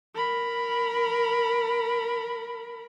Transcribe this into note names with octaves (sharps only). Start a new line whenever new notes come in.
A#4 B5